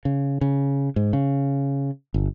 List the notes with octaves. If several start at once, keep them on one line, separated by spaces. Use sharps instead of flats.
C#3
C#3
G#2
C#3
G1